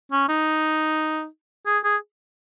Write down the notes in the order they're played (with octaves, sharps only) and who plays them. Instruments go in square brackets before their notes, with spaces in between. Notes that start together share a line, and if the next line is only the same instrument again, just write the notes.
[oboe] C#4
D#4
G#4
G#4